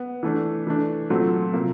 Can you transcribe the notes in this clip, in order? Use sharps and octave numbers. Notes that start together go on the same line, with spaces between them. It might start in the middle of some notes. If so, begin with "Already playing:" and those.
Already playing: B3
E3 A3 D4
E3 A3 D4
A#2 F#3 A3 C4
C3 F3 A#3